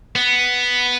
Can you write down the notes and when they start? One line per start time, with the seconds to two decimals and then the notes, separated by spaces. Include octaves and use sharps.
0.16 B3